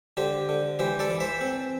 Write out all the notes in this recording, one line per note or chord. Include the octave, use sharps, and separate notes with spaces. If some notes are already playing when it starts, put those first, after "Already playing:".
D3 G4 C5
D3
E3 G4 C5
A4 D5
E3
C5 E5
C4